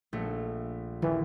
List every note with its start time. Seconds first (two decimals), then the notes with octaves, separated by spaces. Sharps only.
0.13 A#1 A3
1.02 D#1 E3